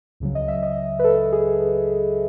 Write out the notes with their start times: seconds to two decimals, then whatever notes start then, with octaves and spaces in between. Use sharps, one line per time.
0.20 C#2 C#3 F#3
0.35 D#5
0.48 E5
0.63 D#5
0.99 B4
1.04 A4
1.32 G#4